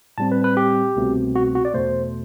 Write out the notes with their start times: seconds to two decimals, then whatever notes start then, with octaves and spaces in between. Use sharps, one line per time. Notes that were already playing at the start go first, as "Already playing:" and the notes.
0.18 A2 G3 C4 A5
0.32 B4
0.44 B4
0.57 G4
0.96 C2 B2 A3 C4
1.35 F#4
1.55 F#4
1.65 D5
1.74 E2 B2 A3 C5